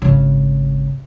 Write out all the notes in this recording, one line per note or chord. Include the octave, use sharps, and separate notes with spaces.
G#1 C#3